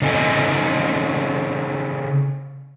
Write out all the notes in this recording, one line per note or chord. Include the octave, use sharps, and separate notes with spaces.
C#3 C4 D#4 A4 G#5